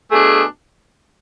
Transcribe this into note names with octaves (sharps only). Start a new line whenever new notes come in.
B2 A3 D4 G#4